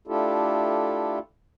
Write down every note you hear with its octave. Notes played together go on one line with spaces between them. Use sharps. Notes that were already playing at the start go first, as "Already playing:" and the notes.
A3 D4 E4 F4 G4 A4